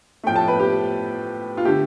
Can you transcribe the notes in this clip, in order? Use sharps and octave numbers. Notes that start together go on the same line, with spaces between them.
A2 F3 A3 G5
A5
B4
G4
F4
D3 A3 G4